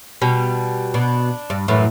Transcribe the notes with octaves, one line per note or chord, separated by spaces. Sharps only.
B2 G3
B2 D4
G2
F#2 A2 E3